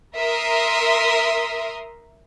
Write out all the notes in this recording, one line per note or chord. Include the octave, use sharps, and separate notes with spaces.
A#4 E5 A#5 C6 D#6